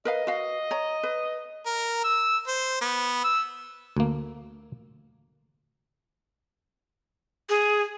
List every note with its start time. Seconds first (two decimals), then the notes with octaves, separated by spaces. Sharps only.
0.05 A#4 B4 D#5 F5
0.27 F#4 B4 F5
0.71 C#5 A#5
1.03 B4
1.66 A#4
2.04 E6
2.47 C5
2.81 B3
3.24 E6
3.97 D2 A#3
7.49 G#4